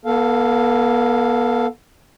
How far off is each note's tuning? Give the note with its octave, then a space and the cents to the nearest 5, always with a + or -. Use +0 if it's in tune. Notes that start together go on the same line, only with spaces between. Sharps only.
B3 -35 A4 +0 F5 +0